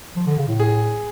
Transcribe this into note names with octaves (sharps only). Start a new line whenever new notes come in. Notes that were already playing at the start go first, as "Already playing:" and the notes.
F3
D3
C#3
A2
G#4